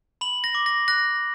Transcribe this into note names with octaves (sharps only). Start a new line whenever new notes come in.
B5 F#7
A#6
D6
A#6
F#6 A#6